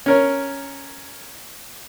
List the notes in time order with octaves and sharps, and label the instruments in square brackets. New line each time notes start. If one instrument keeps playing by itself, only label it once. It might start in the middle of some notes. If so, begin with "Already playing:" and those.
[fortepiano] C#4 A#4 C#5